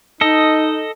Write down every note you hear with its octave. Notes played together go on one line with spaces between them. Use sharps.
D#4 A4 D#5